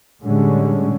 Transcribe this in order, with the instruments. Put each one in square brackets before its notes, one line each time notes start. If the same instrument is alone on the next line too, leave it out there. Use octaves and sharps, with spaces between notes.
[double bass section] A2 D3 G3 G#3 C#4